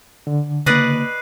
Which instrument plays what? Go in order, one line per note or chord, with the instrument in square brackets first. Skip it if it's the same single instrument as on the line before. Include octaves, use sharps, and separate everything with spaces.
[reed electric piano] D3
[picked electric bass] C#3 A#3 [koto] B4 D5 D#5 [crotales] F#6 C7 D#7